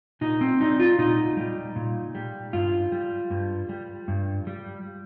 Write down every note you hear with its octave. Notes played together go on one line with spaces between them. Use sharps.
A#2 D#4
C4
G3 D#4
F4
A#2 D#4
G3
A#2
G3
G2 F4
G3
G2
G3
G2
G3